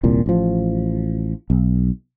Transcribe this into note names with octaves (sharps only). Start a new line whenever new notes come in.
D#1 C2 A#2
A1 F3
B1